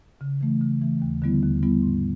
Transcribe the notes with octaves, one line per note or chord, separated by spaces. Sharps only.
C#3
E3 A3
C#3
E3 A3
D#2
D3 G3 B3 E4
D#2
D3 G3 B3 E4
G#2